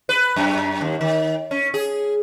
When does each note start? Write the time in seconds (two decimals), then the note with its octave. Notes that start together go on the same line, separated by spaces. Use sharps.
0.09 B4
0.36 F#2
0.81 D#2
1.01 D#3
1.51 C#4
1.74 G#4